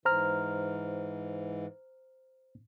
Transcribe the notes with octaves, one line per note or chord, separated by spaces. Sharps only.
G#2 E3 C5 A#5 F6